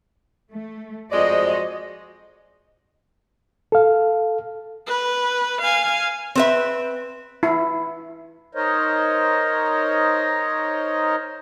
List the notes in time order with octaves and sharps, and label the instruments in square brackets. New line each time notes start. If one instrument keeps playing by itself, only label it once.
[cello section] A3
[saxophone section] F2 G#3 D5 [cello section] F#4 C5 D#5
[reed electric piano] A4 F5
[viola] B4
F5 G#5
[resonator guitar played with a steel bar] C4 B4 E5
[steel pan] E4
[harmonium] D#4 A#4 C5 C#5 D#5